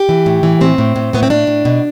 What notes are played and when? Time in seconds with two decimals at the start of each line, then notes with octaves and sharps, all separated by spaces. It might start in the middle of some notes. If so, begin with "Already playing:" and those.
Already playing: G4
0.09 E3
0.26 A2
0.43 E3
0.61 A2 C4
0.78 A2
0.96 A2
1.13 A2 B3
1.23 C4
1.30 A2 D4
1.47 A2
1.65 B2